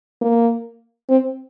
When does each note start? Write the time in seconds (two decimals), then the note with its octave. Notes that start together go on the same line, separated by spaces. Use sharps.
0.22 A#3
1.09 C4